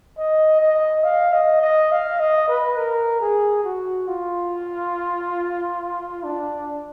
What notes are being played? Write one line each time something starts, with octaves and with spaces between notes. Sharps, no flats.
D#5
D#5
F5
D#5
D#5
F5
D#5
B4
A#4
G#4
F#4
F4
D4